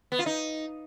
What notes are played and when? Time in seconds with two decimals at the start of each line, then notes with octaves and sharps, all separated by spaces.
0.12 B3
0.19 F4
0.26 D#4